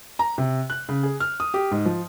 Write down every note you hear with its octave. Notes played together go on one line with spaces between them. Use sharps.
A#5
C3
F#6
C#3
G#4
F6
D#6
G4
G#2
F3